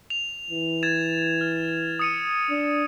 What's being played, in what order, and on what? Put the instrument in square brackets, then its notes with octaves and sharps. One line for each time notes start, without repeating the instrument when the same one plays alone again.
[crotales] F7
[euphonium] E3
[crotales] G#6 A6 E7
F6
D#6 C#7 D#7
[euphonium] D4